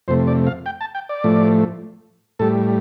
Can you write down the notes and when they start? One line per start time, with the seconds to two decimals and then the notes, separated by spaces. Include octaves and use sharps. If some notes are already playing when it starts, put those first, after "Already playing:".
0.08 F2 C3 A3 C5
0.27 D5
0.47 F5
0.66 G5
0.81 A5
0.95 G5
1.09 D5
1.24 A2 F3 A3
2.39 A2 G3 A4